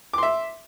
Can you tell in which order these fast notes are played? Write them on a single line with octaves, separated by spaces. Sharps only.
D6 C6 E5